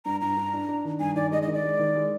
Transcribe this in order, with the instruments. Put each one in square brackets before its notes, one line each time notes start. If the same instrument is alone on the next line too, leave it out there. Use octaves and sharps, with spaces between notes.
[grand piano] G2 [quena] A#5
[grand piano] G2 [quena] A#5
[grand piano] D4
D4
D4
D#3
[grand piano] G2 [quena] G#5
[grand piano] D#3 [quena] D5
[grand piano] G#3 [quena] D#5
[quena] D#5
[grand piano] D#3
[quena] D5
[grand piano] G#3
D#3
G#3